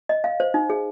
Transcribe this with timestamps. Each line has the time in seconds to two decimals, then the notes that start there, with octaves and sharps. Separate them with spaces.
0.09 D#5
0.24 F5
0.40 C5
0.54 D#4
0.70 G#4